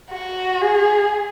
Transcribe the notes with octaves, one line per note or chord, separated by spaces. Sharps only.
F#4
G#4